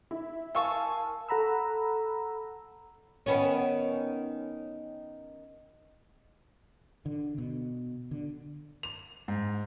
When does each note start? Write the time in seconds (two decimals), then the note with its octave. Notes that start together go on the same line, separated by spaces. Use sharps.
0.11 E4
0.55 A#4 F5 G#5 A5 C#6 E6
1.29 A4 F#5 A#5 B5 E6
3.26 D#3 B3 C#4
7.06 D3
7.38 B2
8.11 D3
8.83 F7
9.28 G#2